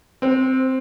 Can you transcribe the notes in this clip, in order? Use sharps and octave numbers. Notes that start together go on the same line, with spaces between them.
C4 C5